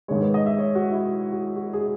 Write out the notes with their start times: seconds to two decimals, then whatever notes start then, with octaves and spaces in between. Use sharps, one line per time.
0.08 G#2 D#3 G#3 C#5
0.21 B4
0.34 D#5
0.46 E5
0.58 C#5
0.75 F#4
0.91 E4
1.32 F#4
1.56 F#4
1.73 G#4